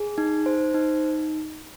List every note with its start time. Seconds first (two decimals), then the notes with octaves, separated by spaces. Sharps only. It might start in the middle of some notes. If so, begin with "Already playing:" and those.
Already playing: G#4
0.18 D#4
0.46 C5
0.74 D#4